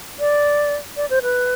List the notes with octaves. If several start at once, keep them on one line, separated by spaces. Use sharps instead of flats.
D5
D5
C5
B4